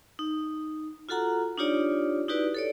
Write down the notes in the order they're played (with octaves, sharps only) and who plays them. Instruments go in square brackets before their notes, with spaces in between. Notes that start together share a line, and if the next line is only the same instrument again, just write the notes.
[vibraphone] D#4
F4 F#4 A4 F#5 A#5
D4 D#4 F4 G4 C#5 D5
D#4 E4 F#4 G4 B4 D5
A4 C#5 D5